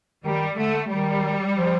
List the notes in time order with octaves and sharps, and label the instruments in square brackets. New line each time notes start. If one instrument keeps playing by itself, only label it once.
[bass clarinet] D#3 [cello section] G3
[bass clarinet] D3 [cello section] A3
[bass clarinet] D#3 [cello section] G3
[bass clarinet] F3